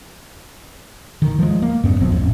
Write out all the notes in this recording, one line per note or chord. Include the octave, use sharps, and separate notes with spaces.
D#3
F3 G#3
A#3
F#2 B3 C4
F1 A#1 F3 C4
A1 F2